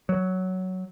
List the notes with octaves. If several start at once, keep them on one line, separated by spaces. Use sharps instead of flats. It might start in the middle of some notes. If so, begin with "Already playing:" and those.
F#3